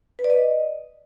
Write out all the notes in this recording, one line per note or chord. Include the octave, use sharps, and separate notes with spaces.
B4
D5
D#5